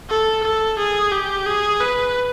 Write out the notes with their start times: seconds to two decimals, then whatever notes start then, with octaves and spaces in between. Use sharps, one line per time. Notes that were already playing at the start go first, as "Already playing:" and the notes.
0.10 A4
0.44 A4
0.79 G#4
1.12 G4
1.46 G#4
1.81 B4